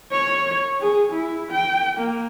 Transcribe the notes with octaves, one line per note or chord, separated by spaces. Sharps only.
C#5
G#4
E4
G5
A#3